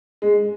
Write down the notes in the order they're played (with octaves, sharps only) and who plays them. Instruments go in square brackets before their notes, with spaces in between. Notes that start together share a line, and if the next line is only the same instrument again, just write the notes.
[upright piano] G#3